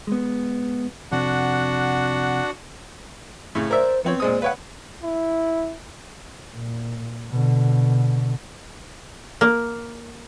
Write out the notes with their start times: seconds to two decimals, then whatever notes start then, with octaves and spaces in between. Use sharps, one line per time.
0.07 G#3 B3
1.12 F2 C3 D4 F#4 F#5
3.55 A2 C#3
3.71 A#4 C5 D5 E5
4.04 F3 B3 C4 C#5
4.20 A#2 G#3 C5 D#6
4.42 B4 C#5 F5 F#5
5.03 E4
6.53 A#2
7.30 B2 D3
9.41 A#3